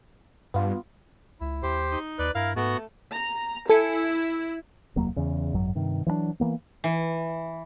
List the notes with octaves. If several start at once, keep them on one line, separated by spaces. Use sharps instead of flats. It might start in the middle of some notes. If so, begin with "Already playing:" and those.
G2 B3 F4
C#2 E4
D#2 G4 C5
D#4
D#2 B4 D5
G2 E4 A#4 F5
G#2 A3 B3 F#4
A#5
E4 A4 G#5 C#7
F1 D#2 F#3 A#3
E2 C#3
G#1 F#2 F#3
G2 C3 D#3
E3 F#3 B3 D4
E3 A#3 B3
E3